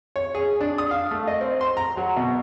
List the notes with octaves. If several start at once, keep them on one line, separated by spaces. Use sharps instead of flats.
C#5
G#4
D4
D#6
F5
A3
D#5
C4
C6
A#5
F#3
B2